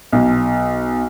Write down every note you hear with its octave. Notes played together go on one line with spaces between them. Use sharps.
B1